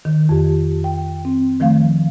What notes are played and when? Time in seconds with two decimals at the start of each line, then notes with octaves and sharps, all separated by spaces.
0.05 D#3
0.29 F2 G4
0.84 G5
1.25 C4
1.60 D#3 F3 A3 F5